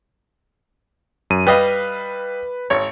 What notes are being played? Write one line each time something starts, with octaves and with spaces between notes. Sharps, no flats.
F#2 D#7
G3 B4 D#5 F5
G#1 C#5